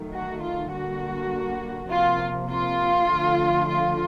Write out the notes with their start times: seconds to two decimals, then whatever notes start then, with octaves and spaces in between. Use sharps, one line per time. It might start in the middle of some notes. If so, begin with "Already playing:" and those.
Already playing: D#3 F#3 A3
0.13 F#4
0.43 F4
0.72 D3 G3 A#3 F#4
1.90 C3 F3 A#3 F4
2.50 F4
3.09 D3 F3 A3
3.68 F4